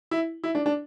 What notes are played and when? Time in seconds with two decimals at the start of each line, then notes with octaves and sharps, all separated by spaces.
0.11 E4
0.43 E4
0.55 D4
0.66 D4